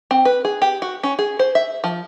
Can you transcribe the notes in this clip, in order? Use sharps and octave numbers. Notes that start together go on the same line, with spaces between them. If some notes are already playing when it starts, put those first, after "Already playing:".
C4
B4
G#4
G4
F#4
C#4
G#4
C5
E5
F3